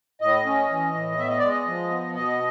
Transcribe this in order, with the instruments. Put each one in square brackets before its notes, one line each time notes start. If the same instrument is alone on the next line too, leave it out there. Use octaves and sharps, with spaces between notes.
[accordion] A2 D#5
C#4
E3
A2
B3 E5
D#5
G#3 D5
D#5
F3
B3
B2 D#5